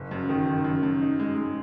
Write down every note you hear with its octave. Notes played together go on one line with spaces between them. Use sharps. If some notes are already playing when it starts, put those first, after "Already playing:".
Already playing: F#1
F#2
D#3
D#3
F#2
F#2
D#4
G#3
G#3